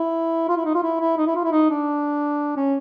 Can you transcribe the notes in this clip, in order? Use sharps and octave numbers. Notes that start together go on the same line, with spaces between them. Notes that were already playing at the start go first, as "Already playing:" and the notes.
Already playing: E4
F4
E4
D#4
F4
E4
E4
D#4
E4
F4
E4
D#4
D4
C#4